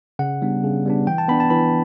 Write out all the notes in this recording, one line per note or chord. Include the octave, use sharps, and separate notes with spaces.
C#3 F#5
G3 B3 D4
C#3
G3 B3 D4
E3 G5
A5
B3 D4 B5
A5
E3 B5